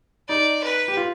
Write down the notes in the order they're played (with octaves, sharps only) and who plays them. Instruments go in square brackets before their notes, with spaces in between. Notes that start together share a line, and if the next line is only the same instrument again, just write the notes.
[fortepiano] D#4 [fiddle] D5
[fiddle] B4
[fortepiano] G4
F4